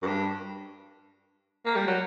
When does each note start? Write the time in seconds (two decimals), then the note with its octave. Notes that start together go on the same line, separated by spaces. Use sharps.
0.02 F#2
0.07 G2
1.66 A#3
1.76 G3
1.87 F#3